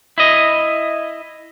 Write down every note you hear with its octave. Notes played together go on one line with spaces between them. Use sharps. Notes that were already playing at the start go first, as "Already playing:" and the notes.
E4 D#5